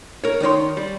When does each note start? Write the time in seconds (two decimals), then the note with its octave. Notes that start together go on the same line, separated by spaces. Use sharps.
0.24 A#4 C#5
0.40 D#3 D#4 C#5 C6
0.77 G3